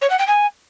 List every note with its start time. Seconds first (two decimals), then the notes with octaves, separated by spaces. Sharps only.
0.01 C#5
0.10 F#5
0.18 G5
0.27 G#5